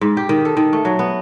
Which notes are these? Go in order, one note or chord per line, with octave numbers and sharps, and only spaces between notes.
G#2
G4
D#3
A4
D#3
A3
F#3
B3